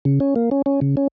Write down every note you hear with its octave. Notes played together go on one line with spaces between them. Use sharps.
C#3
C#4
A#3
C#4
C#4
C#3
C#4